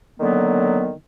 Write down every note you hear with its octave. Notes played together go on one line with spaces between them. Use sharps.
D3 D#3 F#3 A#3 B3